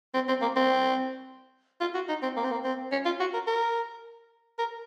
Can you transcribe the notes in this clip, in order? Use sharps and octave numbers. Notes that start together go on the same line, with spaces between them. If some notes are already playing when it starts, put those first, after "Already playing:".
C4
C4
A#3
C4
F4
F#4
D#4
C4
A#3
C4
A#3
C4
C#4
F4
F#4
A#4
A#4
A#4